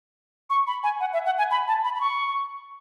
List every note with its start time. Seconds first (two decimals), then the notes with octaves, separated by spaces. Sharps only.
0.50 C#6
0.67 B5
0.83 G#5
1.00 F#5
1.13 E5
1.26 F#5
1.38 G#5
1.51 B5
1.68 A5
1.84 B5
1.95 B5
2.01 C#6